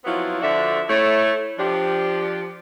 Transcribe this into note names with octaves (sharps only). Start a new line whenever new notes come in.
F3 F#3 B3 C4 E4 F4
D3 F3 D4 F#4 E5
A3 E4 C#5
F3 D4 G4